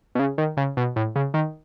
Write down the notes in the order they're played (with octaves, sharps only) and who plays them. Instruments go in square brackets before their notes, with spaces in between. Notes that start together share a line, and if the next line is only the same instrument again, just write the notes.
[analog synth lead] B2
C#3
D#3
C#3
B2
A2
C#3
D#3